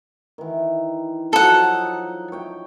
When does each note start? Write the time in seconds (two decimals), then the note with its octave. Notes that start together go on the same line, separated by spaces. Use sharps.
0.38 D#3 E3
1.33 F3 F#3 D#4 A4 F#5
2.32 C#5 G5